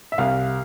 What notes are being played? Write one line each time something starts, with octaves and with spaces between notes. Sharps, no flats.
E5
C2 F5